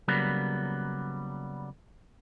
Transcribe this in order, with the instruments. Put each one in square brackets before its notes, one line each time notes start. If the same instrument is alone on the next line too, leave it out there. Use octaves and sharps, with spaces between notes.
[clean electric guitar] C#3 F#3 G3 A#3 B3